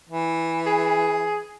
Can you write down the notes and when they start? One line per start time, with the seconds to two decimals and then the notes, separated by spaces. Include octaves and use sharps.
0.09 E3
0.66 G#4